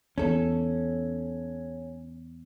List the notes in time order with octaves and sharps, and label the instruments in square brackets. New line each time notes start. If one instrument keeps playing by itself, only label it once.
[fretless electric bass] E2 [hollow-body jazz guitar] C#4 A4